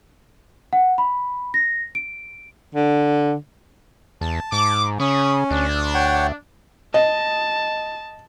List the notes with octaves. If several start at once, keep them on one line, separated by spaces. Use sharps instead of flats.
F#5
B5
A#6
D7
D3
E2 A5
G#2 D6
C#3 C#4 B5 C#6 D#6
D2 D4
C#5 F#5 G5
D#5 A5